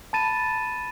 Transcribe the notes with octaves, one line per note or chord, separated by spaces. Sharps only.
A5 B5 A6 D#7 E7